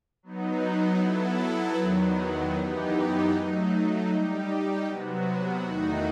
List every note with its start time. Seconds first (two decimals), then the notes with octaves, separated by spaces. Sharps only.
0.23 F#3 B3 D#4
1.00 F#3 B3 E4 A4
1.77 E2 D#3 F#3 B3
2.55 F#2 E3 B3 D#4 G4
3.32 F#3 A3 D#4
4.09 G3 D#4 G4
4.86 C3 F#3 B3 F#4
5.63 E2 D#3 A3 D#4 F#4